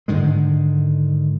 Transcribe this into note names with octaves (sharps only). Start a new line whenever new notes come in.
G#2 D3 D#3 G#3